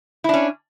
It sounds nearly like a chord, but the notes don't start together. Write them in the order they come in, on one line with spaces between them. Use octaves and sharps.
E4 D4 C#4